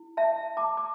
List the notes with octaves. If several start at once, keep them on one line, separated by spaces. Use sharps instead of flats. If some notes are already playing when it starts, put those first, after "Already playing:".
Already playing: E4
E5 A5
A5 D6
D6